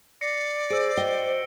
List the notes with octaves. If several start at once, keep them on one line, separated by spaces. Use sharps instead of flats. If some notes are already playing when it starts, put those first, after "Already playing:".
D5 A#6 C7 C#7
G#4 C5 E6 D7
F#4 D#5 G5 G7